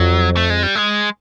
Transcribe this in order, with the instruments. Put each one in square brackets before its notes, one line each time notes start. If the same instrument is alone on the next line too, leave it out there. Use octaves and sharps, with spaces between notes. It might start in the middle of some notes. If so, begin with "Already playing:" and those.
Already playing: [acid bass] F2 [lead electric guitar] F#3
[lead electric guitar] A3
G#3
G3
G#3